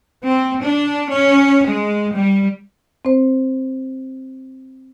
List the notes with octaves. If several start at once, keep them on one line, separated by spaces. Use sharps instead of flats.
C4
D4
C#4
G#3
G3
C4 C5